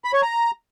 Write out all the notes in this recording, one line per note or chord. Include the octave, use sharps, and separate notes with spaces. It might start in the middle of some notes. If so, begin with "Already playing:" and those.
B5
C#5
A#5